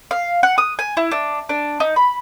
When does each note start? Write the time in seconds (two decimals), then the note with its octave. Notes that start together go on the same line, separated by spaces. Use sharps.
0.11 F5
0.43 F#5
0.58 D#6
0.79 G#5
0.97 E4
1.11 D4
1.49 D4
1.80 D#4
1.96 B5